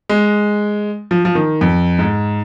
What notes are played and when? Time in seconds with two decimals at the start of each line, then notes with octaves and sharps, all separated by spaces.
0.09 G#3
1.11 F3
1.25 F3
1.35 D#3
1.61 F2
1.99 G#2